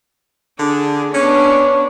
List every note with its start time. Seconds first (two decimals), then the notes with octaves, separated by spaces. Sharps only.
0.59 D3 D4 G#4
1.14 B3 C#4 D4 C#5